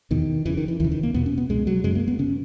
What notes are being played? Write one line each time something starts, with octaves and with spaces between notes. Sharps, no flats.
E2 B2 D#3
E2 C#3 E3
D#3
E3
D#2 C#3 E3
D#3
A#3
E2 B2 B3
C#4
B3
C#2 B2 G#3
F#3
F#2 C#3 G#3
A#3
B3
C#3 C#4